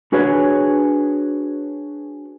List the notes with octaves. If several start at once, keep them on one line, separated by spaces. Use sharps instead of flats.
D4 F#4 G#4 B4 C#5